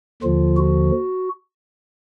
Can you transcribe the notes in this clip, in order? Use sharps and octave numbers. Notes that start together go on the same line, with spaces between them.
D#2 D3 F3 F4
F#4